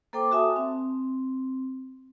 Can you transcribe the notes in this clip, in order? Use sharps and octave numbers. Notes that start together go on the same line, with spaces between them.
A#3 A4 C5 G5 D6
F#4 A4 E5 G#5 A5 D#6
C4